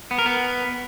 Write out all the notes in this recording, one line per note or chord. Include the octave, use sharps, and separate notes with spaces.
B3
A#4
B3